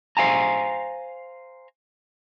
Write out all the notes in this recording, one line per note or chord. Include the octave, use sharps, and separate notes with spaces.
C5 F5 G#5 A#5